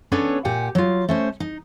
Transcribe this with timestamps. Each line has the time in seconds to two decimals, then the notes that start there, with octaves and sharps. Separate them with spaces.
0.12 B3 C#4 D4 A4 B4 C#5
0.45 A#2 G4 F#5 G#5
0.75 F#3 F4
1.09 A3 C#4 C5
1.40 D#4